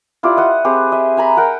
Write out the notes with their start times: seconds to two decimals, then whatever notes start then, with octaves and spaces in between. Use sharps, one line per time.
0.23 E4 F4 G4 D5
0.37 D#5 F#5 D#6
0.64 C4 G4 G#4 B4
0.92 D#5 E5
1.17 G#5 A#5 B5
1.37 A#4 F#5 G5